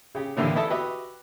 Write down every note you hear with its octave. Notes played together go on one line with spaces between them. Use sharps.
C#3 G4
A2 D3 E3 A#3 E4 G4
B3 E4 A4 D#5 E5 A5
F#4 G4 B4 D#5 E5